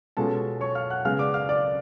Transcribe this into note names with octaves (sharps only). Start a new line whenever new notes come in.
B2 G#3 C#4 F4 A4 A5
C#5 C#6
F5 F6
F#5 F#6
C#3 G#3 B3 F5 F6
D5 D6
F5 F6
D5 D6